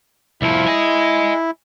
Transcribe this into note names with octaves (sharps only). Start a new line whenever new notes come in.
C2 F3 E4
D#5 G#5